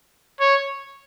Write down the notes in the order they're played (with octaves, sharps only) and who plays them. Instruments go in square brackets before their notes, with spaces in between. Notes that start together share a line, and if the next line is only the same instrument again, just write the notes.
[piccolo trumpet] C#5